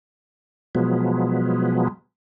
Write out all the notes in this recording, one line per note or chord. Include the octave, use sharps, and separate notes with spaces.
B2 F3 F#3 G#3 B3